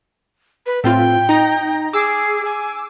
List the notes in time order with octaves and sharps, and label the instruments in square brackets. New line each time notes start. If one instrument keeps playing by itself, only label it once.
[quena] B4
[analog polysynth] A2 C4 F4 [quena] G5
[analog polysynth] D#4 A#5 A#6
[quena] G#4 [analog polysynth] D6 E6
[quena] G#5